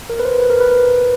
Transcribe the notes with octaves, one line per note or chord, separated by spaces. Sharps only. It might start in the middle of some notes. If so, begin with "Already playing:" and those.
A#4
B4
C5
B4
A#4
B4